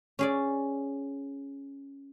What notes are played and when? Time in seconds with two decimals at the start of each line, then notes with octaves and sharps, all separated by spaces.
0.19 C#4 G#4 D5